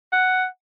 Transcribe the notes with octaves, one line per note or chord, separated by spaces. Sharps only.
F#5